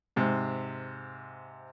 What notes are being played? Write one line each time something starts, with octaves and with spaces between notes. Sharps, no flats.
G#2 C3